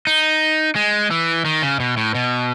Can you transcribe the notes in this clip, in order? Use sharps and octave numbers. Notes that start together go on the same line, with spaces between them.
D#4
G#3
E3
D#3
C#3
B2
A2
B2